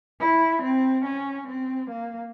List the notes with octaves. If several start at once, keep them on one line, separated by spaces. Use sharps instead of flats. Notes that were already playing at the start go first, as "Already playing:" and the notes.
E4
C4
C#4
C4
A#3